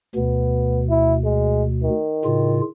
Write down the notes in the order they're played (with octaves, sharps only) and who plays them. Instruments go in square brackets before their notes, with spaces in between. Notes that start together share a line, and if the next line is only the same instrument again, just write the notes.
[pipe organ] D2 B2 [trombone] B3
[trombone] E4
G#3
D#3
[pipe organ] A2 C#3 F4